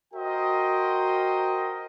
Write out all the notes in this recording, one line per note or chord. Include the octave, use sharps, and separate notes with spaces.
F#4 A#4 C5 D#5 G5